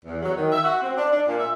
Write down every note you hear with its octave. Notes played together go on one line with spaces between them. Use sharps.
E2
F#3
D#3
E5
F#4
C4
D4
D4
A#2
E5